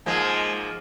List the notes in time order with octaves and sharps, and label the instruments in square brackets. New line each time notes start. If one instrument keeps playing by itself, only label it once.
[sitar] G#2 F3 A#3 [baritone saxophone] G#3